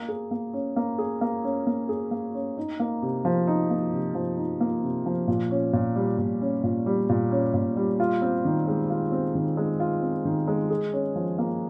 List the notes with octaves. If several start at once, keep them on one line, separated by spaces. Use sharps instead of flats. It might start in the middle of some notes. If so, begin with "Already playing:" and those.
Already playing: A#3
G#4
A#3
C#4
A#3
G#4
A#3
C#4
A#3
G#4
A#3
C#4
D#4
A#3
C3
F3
D#4
A#3
C3
F3
D#4
A#3
C3
F3
A#2
C#4
A#2
G3
A#2
C#4
A#2
G3
A#2
C#4
A#2
G3
F4
C4
D#3
G#3
F4
C4
D#3
G#3
F4
C4
D#3
G#3
G#4
C#4
F3
A#3